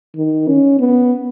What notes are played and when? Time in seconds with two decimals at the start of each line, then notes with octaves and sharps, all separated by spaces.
0.16 D#3
0.48 C#4
0.80 B3